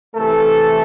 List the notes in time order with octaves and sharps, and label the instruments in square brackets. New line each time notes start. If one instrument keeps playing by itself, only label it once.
[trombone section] C3 E3 A3 A4